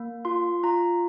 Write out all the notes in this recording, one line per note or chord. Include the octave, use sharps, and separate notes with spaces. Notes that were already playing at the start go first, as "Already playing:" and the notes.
Already playing: A#3
F4 C6
F4 A#5